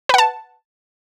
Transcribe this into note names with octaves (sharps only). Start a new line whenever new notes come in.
B4 F#5 A5